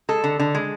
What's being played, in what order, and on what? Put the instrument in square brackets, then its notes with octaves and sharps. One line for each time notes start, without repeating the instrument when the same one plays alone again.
[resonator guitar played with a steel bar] G#3 A4
D3
D3
G#3